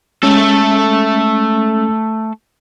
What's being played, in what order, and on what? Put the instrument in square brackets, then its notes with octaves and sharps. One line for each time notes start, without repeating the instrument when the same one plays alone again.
[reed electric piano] G#3 C#4 [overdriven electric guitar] A3 A4